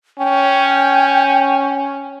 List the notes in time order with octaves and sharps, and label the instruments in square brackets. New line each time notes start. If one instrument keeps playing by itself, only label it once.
[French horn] C#4 [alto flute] G5